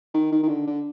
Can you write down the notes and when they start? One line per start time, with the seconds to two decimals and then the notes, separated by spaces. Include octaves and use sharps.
0.14 D#3
0.32 D#3
0.43 D#3
0.48 D3
0.67 D3